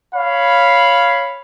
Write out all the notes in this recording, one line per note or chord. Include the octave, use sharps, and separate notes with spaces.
C#5 F5 B5